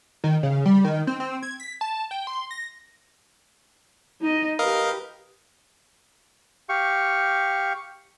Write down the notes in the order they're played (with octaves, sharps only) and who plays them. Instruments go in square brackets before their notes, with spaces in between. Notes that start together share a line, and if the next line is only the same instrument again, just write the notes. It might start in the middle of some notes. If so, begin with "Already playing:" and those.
[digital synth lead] D#3
C#3
G3
D#3
C4
C4
G#6
B6
A5
G5
C6
A#6
[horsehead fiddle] D#4 D#5
[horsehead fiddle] G4 B4 [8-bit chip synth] A#4 D#5 F5
[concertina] G4 F5 C#6